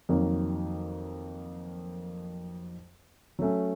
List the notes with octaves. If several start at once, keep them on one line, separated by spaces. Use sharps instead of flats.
F2 D#3 F#3 A#3
F#3 A3 C#4